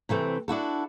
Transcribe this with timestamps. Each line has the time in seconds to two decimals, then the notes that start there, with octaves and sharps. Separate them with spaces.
0.09 C3 E3 A3 C4
0.48 D4 E4 F#4 A4